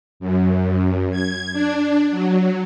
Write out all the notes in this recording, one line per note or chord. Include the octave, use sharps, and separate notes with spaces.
F#2
G#6
D4
F#3